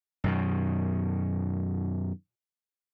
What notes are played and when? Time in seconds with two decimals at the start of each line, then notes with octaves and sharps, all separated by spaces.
0.24 F#2 B2 D#3